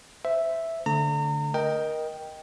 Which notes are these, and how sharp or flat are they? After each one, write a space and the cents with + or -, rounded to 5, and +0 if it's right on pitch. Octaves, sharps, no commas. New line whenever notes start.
C5 -15 E5 +0
D3 -15 A3 +0 A#5 -35
A#4 +20 D#5 +0 G5 +0